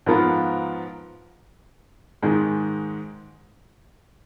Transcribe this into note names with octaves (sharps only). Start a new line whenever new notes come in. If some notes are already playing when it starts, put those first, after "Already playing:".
G#2 F3 B3 F4 A#4
G#2 D#3 G#3